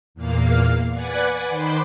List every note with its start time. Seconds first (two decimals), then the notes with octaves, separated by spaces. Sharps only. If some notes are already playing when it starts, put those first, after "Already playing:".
0.14 E2 A#2 A#3 F5
0.93 B4 D5 F#5 G#5
1.49 D#3 C5 B5 C6 D6